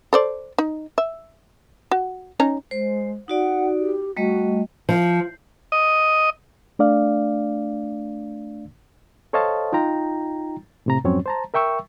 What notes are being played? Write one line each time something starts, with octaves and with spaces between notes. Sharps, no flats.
A4 C5 D5
D#4
E5
F#4
C#4 D#4 A#5
G#3 C5
D#4 F#4 D5 F#5
G4
G3 A3 F#4 D#5
F3
D#5
A3 D4 D5 F5
A4 C5 C#5 D#5 F5 A5
D#4 F4 G5 A#5
A2 C3 A#5
F2 G#2 F#3 C4 C#4 C#5
C5 A5 A#5
A#4 E5 G5 C#6 E6